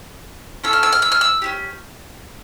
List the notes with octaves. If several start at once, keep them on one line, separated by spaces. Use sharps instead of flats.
C#4 F4 A4 E6
F6
E6
F6
E6
F6
E6
C#4 E4 G4